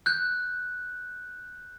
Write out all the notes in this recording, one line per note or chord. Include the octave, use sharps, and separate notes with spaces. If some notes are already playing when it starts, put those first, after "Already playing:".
F#6 G6